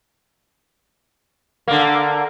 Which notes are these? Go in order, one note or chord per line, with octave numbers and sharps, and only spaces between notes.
D3 A#3